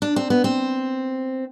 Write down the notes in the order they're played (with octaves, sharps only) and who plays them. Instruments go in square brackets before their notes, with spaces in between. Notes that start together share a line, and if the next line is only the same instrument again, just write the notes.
[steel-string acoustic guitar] D4
C4
B3
C4